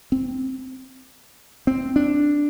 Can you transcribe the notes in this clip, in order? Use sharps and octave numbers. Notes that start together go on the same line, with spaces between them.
C4
C4
D4